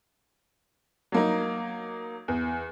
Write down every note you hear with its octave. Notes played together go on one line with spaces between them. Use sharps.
F#3 A#3 D#4
E2